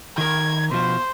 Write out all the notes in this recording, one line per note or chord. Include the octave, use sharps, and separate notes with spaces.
D#3 A#4 G#6
B2 F3 C5